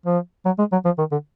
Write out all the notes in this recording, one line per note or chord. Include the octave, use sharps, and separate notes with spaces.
F3
F#3
G#3
F#3
F3
D#3
D3